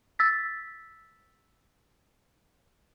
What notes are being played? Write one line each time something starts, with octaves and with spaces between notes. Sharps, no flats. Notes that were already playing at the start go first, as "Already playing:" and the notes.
E6 A6 B6